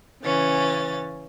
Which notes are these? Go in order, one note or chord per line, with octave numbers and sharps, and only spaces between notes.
C#3 E3 C#4 A6